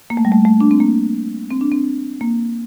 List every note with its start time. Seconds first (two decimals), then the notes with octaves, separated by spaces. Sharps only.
0.10 A#3
0.17 A3
0.25 G3
0.32 A3
0.45 A3
0.60 D4
0.71 C4
0.80 A#3
1.51 C4
1.61 D4
1.71 C4
2.21 A#3